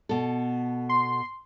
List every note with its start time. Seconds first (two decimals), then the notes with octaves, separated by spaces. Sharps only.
0.09 B2 A4
0.89 C6